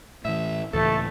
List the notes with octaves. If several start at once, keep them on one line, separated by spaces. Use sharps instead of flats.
A2 E3 E5
C#2 A2 E3 A3 A4